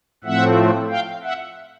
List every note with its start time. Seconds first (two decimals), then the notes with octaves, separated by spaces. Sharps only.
0.24 A2 F3 A3 C4 E5 F#5
0.90 F5 G5
1.23 E5 F#5